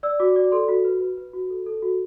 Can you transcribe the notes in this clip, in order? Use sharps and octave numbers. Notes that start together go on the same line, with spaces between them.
D5 E6
F#4 D6
D5 D6
A4 C6
F#4 B5
B4
B4
B4
F#4
A4
A4
F#4